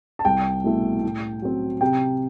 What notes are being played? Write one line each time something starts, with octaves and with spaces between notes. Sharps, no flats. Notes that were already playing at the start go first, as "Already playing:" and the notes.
A5
C2 G5
B2 A3 E4
A2
F#3 C4
C3 G5